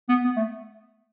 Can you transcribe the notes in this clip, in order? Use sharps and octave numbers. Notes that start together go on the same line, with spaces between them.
B3
B3
A3